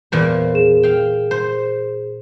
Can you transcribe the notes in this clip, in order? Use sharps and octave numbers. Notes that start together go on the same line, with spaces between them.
E2 A#2 C5
G#4 E7
F5 G5
C5